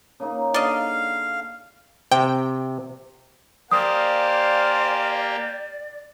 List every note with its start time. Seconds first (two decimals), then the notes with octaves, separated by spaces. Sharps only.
0.20 C#3 A#3 D#4
0.54 D3 D5 D#5 F5
2.11 C3 G5
3.71 A#3 G4 C5 D5 F5 G#5 D#6